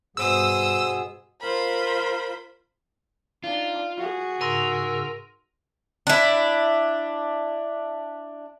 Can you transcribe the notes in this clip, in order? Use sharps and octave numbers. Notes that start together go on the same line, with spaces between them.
G2 B2 B3 G#4 C5 D#6 E6
F4 A#4 C5 B5
D4 D#4 F4
F#4 G#4
G#2 C#3 A#4 C6 E6 A#6 D#7
D4 E4